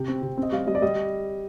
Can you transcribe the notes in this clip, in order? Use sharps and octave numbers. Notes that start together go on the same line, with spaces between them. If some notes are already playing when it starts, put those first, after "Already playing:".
Already playing: C3 G5
C4
C3
C4
D#5
G3 F5
G3 D#5
D5
G3 D#5